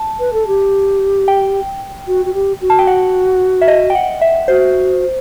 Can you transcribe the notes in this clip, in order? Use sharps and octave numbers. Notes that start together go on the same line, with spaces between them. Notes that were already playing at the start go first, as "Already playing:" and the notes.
Already playing: A5
B4
A4
G4
G5
F#4
F#4
G4
F#4
A5
G5
F#5
E5
D#5
G5
F#5
E5
F#4 C5